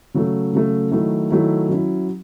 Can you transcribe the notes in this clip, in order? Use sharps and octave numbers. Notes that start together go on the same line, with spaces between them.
C#3 F#3 A3
C#3 F#3 A3
D#3 F#3 A3 E4
D#3 F#3 A3 E4
F#3 C#4 E4